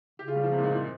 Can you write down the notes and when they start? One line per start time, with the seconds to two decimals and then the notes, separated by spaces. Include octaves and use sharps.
0.19 C#3 G4
0.28 F4
0.35 G3
0.44 F3
0.52 C3
0.58 A#2
0.63 G#2
0.74 A#2